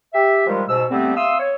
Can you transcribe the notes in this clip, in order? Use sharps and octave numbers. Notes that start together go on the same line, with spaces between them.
G4 E5
D#3 F3 G3 G#3
G#2 B2 E6
D3 G3 A3 B3 C4
E5 F5 C6 D#6 E6
C#5